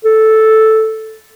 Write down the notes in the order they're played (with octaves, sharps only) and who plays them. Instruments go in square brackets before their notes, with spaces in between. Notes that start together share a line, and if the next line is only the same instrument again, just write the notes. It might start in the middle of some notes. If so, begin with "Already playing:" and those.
[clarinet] A4